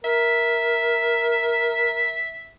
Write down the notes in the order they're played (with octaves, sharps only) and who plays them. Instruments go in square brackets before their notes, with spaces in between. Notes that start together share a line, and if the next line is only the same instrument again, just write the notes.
[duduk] A#4 [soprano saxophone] E5